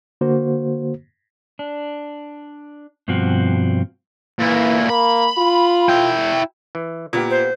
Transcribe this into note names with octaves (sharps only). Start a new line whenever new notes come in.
D3 A#3 F#4 C5
D4
G2 B2 F3 C4 F#4
A#2 E3 E4
A#3 B5
F4
E4 G5
E3
A#2 A#3 B3 G4
C5